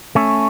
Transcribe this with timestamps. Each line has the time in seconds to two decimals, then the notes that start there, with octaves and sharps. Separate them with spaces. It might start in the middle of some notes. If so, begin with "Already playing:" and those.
0.15 A3 C#4